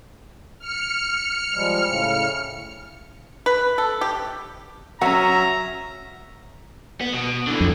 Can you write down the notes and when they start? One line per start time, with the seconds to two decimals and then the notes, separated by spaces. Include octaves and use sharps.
0.59 F6 C#7
1.55 F3 G3 G#3
1.87 A2 C#3
3.46 B4
3.78 A4
4.01 G4
5.01 F#3 C#4 E5 F#5 A#5
7.01 B3
7.14 B2
7.48 D3 E3
7.61 F2